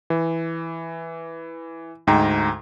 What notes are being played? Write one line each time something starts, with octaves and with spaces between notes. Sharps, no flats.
E3
D2 G#2 G5 A#5 C7